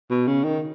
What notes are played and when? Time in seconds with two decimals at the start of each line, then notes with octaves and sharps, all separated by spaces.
0.10 B2
0.27 C#3
0.44 D#3